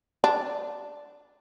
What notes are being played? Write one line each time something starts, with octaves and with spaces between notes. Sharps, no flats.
D4